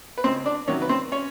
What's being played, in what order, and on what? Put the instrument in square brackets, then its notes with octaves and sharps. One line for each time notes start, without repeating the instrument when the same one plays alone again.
[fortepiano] B4
C#2 C4 C5
D4 D5
C3 D#3 F#3 C#4 C#5
B4
C4 C5
C#4 C#5